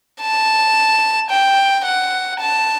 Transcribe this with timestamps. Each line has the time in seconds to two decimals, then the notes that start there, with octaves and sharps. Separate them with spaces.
0.22 A5
1.30 G5
1.85 F#5
2.40 A5